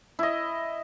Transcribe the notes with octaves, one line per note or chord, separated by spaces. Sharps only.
E4 D#5